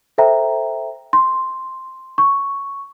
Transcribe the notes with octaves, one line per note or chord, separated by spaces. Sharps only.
A4 C5 E5 G5 A#5
C6
C#6